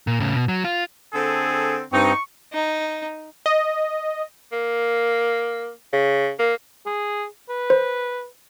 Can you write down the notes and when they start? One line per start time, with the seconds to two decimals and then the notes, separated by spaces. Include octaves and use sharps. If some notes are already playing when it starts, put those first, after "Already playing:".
0.07 A#2
0.20 A2 C#3
0.36 B2
0.48 F#3
0.64 F4
1.13 D3 C4 G#4 A4
1.92 G2 C4 D#4 C#6
2.53 D#4
3.46 D#5
4.52 A#3
5.93 C#3
6.39 A#3
6.86 G#4
7.49 B4
7.70 C5